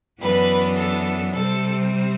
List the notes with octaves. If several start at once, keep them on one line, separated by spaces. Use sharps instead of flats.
F#2 E3 B3 D4 B4
A4
C3 G3 C4 A4